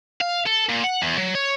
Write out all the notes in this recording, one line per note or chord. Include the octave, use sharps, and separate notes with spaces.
F5
A4
A#2
F#5
E2
F#3
C#5